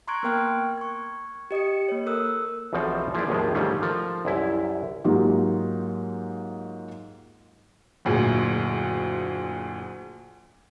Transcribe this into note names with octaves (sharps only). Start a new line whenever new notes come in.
A#5 C6 C#6 F#6 G#6 D7
A#3 B3 A#4 G5 F6 F#6
C#6 G#6
G4 D#5 D#6 C#7
A#3 C#5
A4 A#4 D#6 E6 F#6
B1 E2 B2 F3 C4 A4
E3 F3 A#3 G#4 D5 E5
G#1 D#2 A2 D#3 F3 G#3
G#2 D#3 G3 A3 C#4 F4
F3 A4 A#4
C2 F#2 E4
G#2 F#3 A#3 D#4 F4 G4
F#1 D2 A#2 G#4